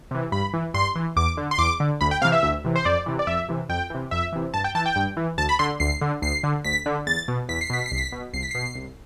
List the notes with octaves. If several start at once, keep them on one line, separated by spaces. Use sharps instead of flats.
C3 E3
G2 B5
E3
G2 C6
E3
E2 D6
D3
C6
E2 D6
D3
D2 B5
G5
C3 E3 F5
E5
D2
C3 E3
C5
F2 D5
C3 E3
D5
F2 E5
C3 E3
F2 G5
C3 E3
F2 E5
C3 E3
G2 A5
G5
E3 A5
G5
G2
E3
D2 A5
B5
D3 C6
D2 C7
D3
D2 C7
D3
D2 B6
D3
E2 A6
B2
E2 B6
C7
B2 B6
C7
C2
B6
B2
C2 C7
B6
B2 C7
C2